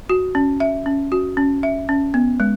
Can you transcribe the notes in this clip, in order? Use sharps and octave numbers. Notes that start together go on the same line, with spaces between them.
F#4
C#4
E5
C#4
F#4
C#4
E5
C#4
B3
G#3